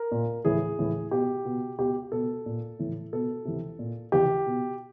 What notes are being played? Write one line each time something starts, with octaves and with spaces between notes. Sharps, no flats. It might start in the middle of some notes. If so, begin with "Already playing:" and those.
Already playing: A#4
A#2
A2 E3 G#4
A2 E3
B2 G4
B2
B2 G4
B2 A4
A#2
A2 E3
B2 A4
C3 E3
A#2
C3 E3 G4
B2